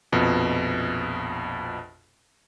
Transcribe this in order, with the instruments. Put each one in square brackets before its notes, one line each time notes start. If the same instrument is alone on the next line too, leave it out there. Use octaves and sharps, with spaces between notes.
[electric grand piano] A#1 F2 B2